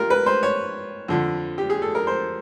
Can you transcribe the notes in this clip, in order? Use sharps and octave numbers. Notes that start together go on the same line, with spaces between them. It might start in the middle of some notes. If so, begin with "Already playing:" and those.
Already playing: F4 G4 A#4
B4
C5
C#5
F2 D3 F3
G4
G#4
A4
A#4
C5